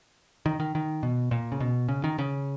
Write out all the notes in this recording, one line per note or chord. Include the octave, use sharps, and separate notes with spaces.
D#3
D#3
D#3
B2
A#2
C#3
B2
C#3
D#3
C#3